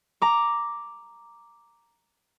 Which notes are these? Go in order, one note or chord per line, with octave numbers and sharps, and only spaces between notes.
A#5 D6